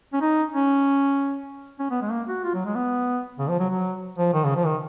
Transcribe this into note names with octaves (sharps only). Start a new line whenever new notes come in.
C#4
D#4
C#4
C#4
B3
G#3
A#3
F#4
F4
F#3
G#3
B3
C#3
F3
F#3
F#3
F3
D#3
C#3
F3
D#3